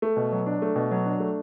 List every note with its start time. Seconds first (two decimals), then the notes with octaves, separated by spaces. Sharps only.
0.02 A3
0.16 B2
0.32 F#3
0.46 D4
0.62 A3
0.76 B2
0.91 F#3
1.06 D4
1.20 A3